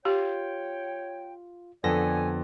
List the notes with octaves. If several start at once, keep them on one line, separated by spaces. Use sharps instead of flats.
F4 G4 C#5 G5
F2 D3 B3 A4 D5 G#5 A#6 B6